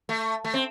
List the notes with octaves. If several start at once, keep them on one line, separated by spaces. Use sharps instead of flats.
A3
A3
C4